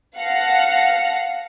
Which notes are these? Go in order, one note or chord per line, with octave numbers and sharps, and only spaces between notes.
F5 F#5 A5 A#6 C#7